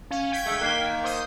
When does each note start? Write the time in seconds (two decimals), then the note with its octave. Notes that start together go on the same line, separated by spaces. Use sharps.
0.11 C#4 F5
0.32 G5 G#6 B6
0.46 D3 G#3 A3
0.61 D#3 A#3 F#6 C7 G7
0.81 F6
1.04 C5 D#6 G6